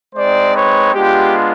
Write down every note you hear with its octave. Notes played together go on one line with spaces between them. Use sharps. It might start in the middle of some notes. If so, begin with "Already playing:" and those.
G#3 C4 D#4 C5 D5
B4 C#5
G#3 B3 D4 F4 G4